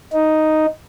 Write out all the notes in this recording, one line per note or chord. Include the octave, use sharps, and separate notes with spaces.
D#4